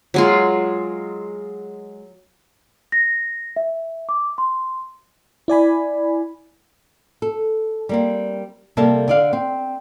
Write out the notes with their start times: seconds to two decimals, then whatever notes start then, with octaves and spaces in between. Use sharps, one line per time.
0.14 F#3 G#3 F4
2.92 A#6
3.56 E5
4.09 D6
4.38 C6
5.48 E4 D5 G#5 B5
7.22 A4
7.89 G3 A#3 C4
8.77 C3 G3 A#3 A4 E5 A5
9.08 D3 D5 F5
9.33 C4